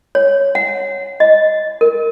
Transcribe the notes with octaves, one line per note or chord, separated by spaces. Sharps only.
C#5
F#5
D#5
A#4